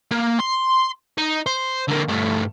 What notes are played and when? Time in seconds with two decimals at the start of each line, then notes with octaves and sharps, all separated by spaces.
0.11 A#3
0.40 C6
1.18 D#4
1.46 C5
1.88 D3 A#3
2.09 G2 A3